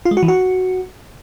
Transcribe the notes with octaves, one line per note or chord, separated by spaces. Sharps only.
F4
G#3
F#4
E3
F#4